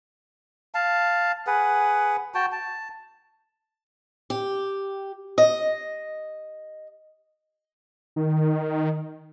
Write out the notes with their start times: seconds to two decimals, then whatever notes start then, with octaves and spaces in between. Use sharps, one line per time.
0.75 F5 A5
1.47 G#4 B4 F#5
2.35 F#4 G5 A5
2.52 A5
4.30 G4
5.38 D#5
8.16 D#3